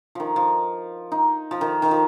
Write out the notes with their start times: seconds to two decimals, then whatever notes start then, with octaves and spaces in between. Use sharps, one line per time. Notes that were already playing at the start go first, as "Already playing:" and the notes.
0.15 D#3 F3
0.36 F3
1.12 D#4
1.51 F3
1.61 D#3
1.82 D#3
1.91 F3